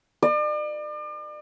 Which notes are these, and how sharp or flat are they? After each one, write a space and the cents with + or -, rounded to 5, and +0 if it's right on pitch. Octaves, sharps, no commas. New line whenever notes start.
D5 +40